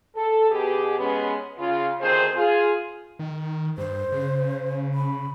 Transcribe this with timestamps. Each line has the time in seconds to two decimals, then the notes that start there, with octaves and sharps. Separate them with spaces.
0.15 A4
0.50 B2 G4 G#4
0.99 G#3 B3 C#4
1.59 C#3 F4
2.00 D2 D#3 F3 C4 G#4 C5
2.35 F4 G#4
3.19 D#3
3.78 G2 C5
4.12 C#3
4.94 B5